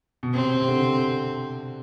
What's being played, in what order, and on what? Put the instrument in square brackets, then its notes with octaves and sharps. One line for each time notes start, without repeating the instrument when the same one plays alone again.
[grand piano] B2
[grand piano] C3 [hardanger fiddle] C4
[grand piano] C3
D3